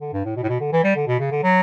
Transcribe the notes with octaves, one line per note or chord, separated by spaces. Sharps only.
D3
G2
A2
B2
A2
B2
D3
E3
G3
D3
B2
C#3
D3
F#3